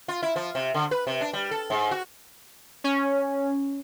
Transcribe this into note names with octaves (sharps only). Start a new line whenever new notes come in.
F4
E4
F3
C3
D3
B4
C3
D4
G3
A4
G#2
F#4
C#4